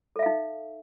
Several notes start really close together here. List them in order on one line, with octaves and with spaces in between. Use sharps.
A4 E5 F5 D#4